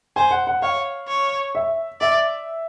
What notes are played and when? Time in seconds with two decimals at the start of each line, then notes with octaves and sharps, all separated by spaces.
0.16 C5 G#5
0.31 F#5
0.47 F#5
0.62 C#5 F5
1.08 C#5
1.55 E5
2.01 D5 E5